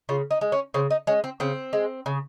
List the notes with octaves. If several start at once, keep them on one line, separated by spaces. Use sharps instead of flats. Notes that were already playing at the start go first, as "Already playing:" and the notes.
C#3 F4
D#4
G#3
C#4
C#3 C4
D#4
G#3 C#4
C4
C#3 C4
G#3
C#3